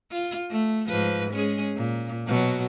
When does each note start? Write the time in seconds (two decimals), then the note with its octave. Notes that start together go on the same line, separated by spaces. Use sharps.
0.11 F4
0.51 A3
0.88 G#2 F3 B4
1.31 G#3 C#4 G#4
1.76 A#2
2.27 B2 F#3